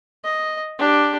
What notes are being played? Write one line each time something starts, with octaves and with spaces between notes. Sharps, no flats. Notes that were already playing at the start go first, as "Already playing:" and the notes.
D#5
D4 G4